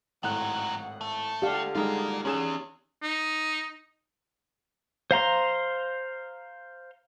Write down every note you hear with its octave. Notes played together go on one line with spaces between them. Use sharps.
G#1 A2 D#3 F#3 F#5 F#6
A3
D3 G4 F5
G3 G#3 D#4 F4 G#4 A#4
E2 C#4 G#4 E7
D#4
C5 F5 A#5 C6